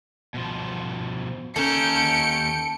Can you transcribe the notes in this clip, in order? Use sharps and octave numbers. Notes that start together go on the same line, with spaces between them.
B2 F3
D#2 C#4 A4 A#5 G6 C#7 D7